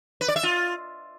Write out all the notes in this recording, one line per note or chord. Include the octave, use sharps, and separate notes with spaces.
B4
D5
E5
F4